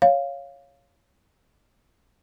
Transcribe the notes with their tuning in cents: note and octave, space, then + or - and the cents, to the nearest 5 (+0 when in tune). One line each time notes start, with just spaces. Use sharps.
C#5 +0 F5 +0